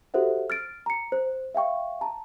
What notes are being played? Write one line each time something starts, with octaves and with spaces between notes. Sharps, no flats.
F#4 G4 A4 C5 E5 F#5
F6 A6 D7
A#5 C#7
C5
E5 F5 G5 C#6
A5 A#5